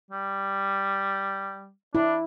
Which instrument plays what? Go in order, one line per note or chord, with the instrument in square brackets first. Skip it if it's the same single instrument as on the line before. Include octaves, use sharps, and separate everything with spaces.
[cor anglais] G3
[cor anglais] D4 [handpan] E4